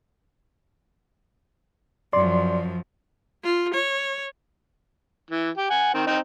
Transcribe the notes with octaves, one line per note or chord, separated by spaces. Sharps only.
F#2 F3 D5 C6
F4
C#5
E3
G4
F#5 G#5
D#3 C4
C4 D#4